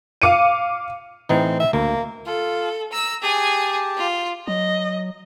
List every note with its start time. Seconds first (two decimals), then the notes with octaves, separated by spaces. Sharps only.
0.22 F5 D6 C#7 D#7
1.29 A2 E3 C4 D#4
1.60 E5
1.73 D2 A#3
2.26 F4 A4
2.92 A#5 E6
3.22 G4 G#4 G#5 A5
3.98 F4
4.47 F#3 D#5